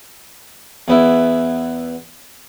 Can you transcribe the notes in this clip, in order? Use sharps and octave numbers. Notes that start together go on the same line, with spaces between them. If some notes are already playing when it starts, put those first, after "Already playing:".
E2 B3 E4